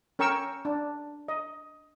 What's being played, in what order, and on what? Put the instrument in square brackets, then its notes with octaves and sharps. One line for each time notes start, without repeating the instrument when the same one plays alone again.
[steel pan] C#4 A#4 G5 C#6 E6
D4
D#5